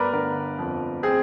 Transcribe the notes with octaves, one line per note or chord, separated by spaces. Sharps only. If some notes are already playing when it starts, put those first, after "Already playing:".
Already playing: G1 G3 A#4 B4 D5
D3 A#4
F2
C4 G#4